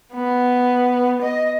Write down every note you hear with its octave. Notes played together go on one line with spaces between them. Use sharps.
B3
D#5